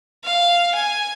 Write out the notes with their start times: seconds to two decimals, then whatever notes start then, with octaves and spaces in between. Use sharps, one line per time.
0.24 F5
0.75 G#5